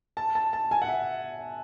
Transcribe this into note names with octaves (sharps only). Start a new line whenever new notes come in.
A5
A5
A5
G#5
F#5
E5